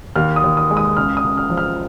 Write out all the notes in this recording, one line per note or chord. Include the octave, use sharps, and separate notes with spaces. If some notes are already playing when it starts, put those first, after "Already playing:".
D#2 F6
D#6
D#2
D#6
G#3
D#6
C#2 F6
D#6
C#2
F6
F3
F6